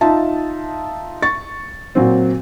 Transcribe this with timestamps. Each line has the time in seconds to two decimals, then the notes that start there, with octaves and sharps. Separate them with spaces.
0.01 D#4 F4 E5 A5
1.22 C#6 A6
1.95 A#2 F#3 C4